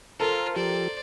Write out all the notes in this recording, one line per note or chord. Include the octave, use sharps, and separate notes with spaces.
F4 A4 A#4 C5 F5
F3 G4 C5 D5